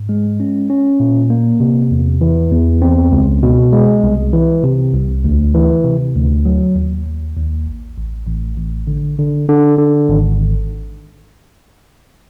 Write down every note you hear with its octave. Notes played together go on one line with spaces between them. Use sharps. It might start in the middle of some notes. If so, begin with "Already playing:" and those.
Already playing: G#2
G#3
C#4
C#4
A#2
A#3
C3
E2
E3
E2
C4
C#2
B2
G#3
C2
E3
C3
C2
D2
E3
C3
D2
F#3
D#2
D#2
D#2
A1
A1
A1
A1
D3
D3
D3
D3
G#1